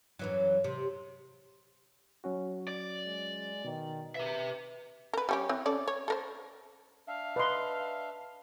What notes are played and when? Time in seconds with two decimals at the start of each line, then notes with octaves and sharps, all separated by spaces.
0.19 F#2 E3 F#3
0.64 C3
2.24 F#3 C#4 F#4
2.68 D5
3.06 G#3
3.65 B2 D#3
4.15 G4 B4 E5
5.13 A#4 B4
5.29 G3 C#4 G4
5.49 E3 C4 C#5
5.66 C#4 A4 D5
5.88 C#5
6.08 A4 A#4 C5
7.07 D4 E5 F5
7.36 B4 D#5 C6